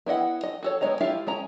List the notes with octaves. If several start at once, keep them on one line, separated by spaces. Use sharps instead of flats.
B3 E4 D#5 F#5
D#5
F#4 A4 C#5
G#3 B3 C#5 D#5 A#5
E4 F4 G4 E5 F5
G#3 C#4 A#5